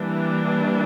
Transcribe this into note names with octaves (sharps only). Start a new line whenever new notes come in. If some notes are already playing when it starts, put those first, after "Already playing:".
Already playing: E3 G3 A#3 D4